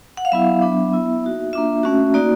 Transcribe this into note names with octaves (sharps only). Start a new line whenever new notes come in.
F#5
F5
F#3 B3 E4 E5
F#3 B3 D4
B3 E4
A#3 D#4 F#4
A#3 D4 F4 E5
A3 C#4 F#4
A#3 D#4 F#4 D5